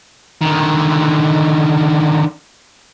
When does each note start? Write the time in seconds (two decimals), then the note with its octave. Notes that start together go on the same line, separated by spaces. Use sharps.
0.42 D3 D#3